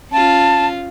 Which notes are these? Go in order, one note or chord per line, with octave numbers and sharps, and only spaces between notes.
C#4 F4 A5